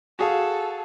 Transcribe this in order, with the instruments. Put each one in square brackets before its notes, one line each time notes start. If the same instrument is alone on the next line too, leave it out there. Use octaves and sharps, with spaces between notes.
[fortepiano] F#4 G#4 F5 [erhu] A4